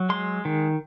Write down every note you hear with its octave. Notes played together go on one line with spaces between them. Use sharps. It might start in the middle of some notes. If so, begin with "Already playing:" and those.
Already playing: F#3
G#3 C6
D#3